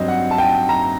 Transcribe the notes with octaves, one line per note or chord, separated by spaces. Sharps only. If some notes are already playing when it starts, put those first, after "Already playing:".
Already playing: G2 F#3 C4 D#5
F#5
A5
G5
A#5